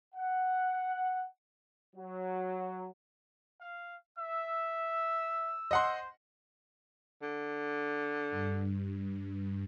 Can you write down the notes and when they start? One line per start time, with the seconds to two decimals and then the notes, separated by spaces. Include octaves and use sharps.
0.15 F#5
1.96 F#3
3.60 F5
4.18 E5 E6
5.71 C5 D#5 F#5 C6
7.22 D3
8.30 G2